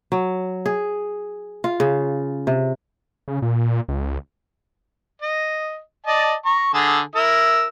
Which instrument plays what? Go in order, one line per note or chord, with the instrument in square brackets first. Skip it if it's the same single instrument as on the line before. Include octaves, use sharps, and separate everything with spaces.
[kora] F#3
G#4
F4
C#3
C3
[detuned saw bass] C#3
A#2
C#2
[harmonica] D#5
D5 D#5 A5
A#5 C#6
D3 G#4 A4
E4 A#4 E6